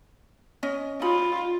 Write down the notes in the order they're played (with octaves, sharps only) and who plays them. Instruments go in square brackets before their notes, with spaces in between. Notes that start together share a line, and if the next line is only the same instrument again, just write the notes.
[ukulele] C#4 D#5
[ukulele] D#4 B5 [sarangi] F4